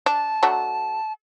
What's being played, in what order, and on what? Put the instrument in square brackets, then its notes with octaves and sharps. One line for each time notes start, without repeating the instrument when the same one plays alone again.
[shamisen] D4 [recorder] A5
[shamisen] F#3 A3 D4